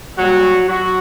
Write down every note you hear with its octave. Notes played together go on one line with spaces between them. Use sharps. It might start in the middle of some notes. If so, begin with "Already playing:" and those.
A#2 F#3 G3 F#4
F#3 F#4